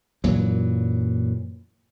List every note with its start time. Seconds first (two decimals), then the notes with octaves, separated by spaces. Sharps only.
0.24 F#2 A#2 E3 F#3